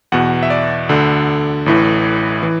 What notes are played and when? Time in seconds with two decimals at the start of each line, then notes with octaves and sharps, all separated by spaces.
0.12 E2 B2 F#5
0.43 E5
0.50 D5
0.89 D2 D3
1.66 A1 A2 E3
2.43 E3